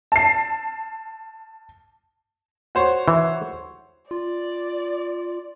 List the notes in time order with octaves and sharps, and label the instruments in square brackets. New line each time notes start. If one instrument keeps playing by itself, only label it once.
[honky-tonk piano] A5 C7
[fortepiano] F#4 C5 C#5
[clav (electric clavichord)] E3
[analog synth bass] F4 [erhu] D5